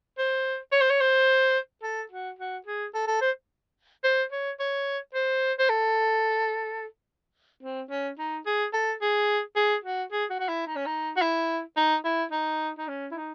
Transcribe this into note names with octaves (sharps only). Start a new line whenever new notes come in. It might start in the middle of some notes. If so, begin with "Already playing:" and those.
C5
C#5
C5
C#5
C5
A4
F#4
F#4
G#4
A4
A4
C5
C5
C#5
C#5
C5
C5
A4
C4
C#4
D#4
G#4
A4
G#4
G#4
F#4
G#4
F#4
F#4
E4
D#4
C#4
D#4
F#4
E4
D#4
E4
D#4
D#4
C#4
E4
D#4